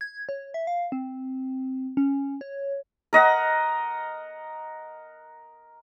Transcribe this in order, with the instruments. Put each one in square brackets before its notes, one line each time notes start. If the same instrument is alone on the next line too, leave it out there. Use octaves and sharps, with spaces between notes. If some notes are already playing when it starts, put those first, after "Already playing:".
[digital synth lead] G#6
C#5
E5
F5
C4
C#4
C#5
[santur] A#4 D#5 F#5